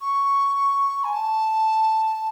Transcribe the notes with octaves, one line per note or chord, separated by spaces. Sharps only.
C#6
G#5
A5